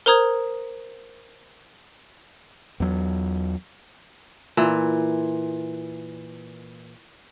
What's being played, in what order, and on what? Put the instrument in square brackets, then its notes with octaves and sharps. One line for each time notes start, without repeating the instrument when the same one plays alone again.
[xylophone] A#4 C5 A#5 D#6 G#6
[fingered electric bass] E2 F#3
[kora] A#2 E3